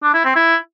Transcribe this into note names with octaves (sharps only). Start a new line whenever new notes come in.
D4
E4
C4
E4